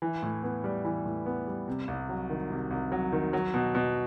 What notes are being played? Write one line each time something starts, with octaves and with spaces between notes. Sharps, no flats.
E3
A2
B3
G3
E3
A2
B3
G3
C3
C2
F#3
D#3
C3
C2
F#3
D#3
F#3
B2
B2